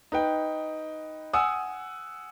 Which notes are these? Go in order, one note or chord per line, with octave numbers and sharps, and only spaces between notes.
D#4 B4 G5
F#5 G#5 D#6 E6